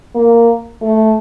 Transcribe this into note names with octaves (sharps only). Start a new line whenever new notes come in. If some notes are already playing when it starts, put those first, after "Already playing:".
A#3
A3